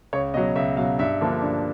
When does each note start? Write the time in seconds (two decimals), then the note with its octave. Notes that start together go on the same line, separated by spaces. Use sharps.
0.13 C#2 C#5
0.34 B2 F#3 D#5
0.56 C#2 E5
0.77 B2 F#3 F5
0.99 G2 E5
1.21 D3 F3 A#3 D4
1.42 G2